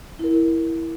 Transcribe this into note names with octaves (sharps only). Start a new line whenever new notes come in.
E4 A#4